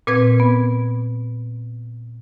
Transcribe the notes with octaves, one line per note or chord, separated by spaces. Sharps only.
A#2 C4 B4 G#6
B3